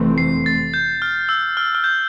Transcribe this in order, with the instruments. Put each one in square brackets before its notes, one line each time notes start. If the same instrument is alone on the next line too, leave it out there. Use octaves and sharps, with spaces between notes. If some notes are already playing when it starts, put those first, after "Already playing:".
Already playing: [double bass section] F1 F2 E3 A3 C4
[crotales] C7
A6
G6
F6
E6
F6
F6
G6